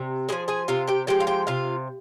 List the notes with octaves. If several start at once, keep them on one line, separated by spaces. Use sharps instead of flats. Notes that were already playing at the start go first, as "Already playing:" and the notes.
Already playing: C3
F3 G#3 G#4 G#5
G#4 G#5
C3 F4 F5
G4 G5
F3 G#3 G4 G5
F5
G4 G5
C3 F4 F5